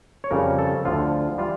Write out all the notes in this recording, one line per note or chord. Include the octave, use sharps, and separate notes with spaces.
C#5
F2 C#3 G3 A#4
A4
D2 D3 F3 F4
E3 G3 F4